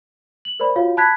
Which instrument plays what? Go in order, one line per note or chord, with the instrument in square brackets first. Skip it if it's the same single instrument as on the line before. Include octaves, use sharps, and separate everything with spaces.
[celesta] F#7
A#4 C5 D5 B5
F4 F#4 C#5 F5
A5 B5 F#6 G#6 B6